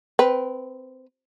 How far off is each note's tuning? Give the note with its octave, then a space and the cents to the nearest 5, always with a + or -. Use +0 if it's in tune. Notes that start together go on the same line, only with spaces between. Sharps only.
C4 -15 B4 +0